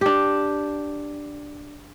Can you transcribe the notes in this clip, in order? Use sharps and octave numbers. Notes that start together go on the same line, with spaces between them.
D4 G4